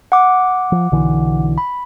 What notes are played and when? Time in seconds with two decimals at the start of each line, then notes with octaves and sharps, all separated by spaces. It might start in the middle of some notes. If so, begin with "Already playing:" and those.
0.12 F#5 D6
0.72 F3
0.92 B1 D3 E3
1.58 B5